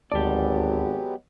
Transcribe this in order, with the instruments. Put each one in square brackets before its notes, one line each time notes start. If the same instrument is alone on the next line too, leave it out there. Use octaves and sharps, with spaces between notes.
[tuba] G#1 [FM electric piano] D2 A5 [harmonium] F#3 G#3 B3 [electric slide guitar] G4 D5